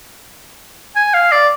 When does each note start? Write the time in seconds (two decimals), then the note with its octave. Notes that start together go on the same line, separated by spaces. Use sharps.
0.96 G#5
1.14 F5
1.32 D5